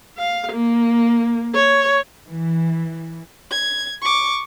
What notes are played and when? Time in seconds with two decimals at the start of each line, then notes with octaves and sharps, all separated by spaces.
0.17 F5
0.52 A#3
1.55 C#5
2.27 E3
3.51 G#6
4.02 C#6 D6